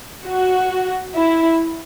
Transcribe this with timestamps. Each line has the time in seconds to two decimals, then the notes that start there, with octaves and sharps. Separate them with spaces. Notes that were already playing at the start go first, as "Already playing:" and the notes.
0.24 F#4
1.15 E4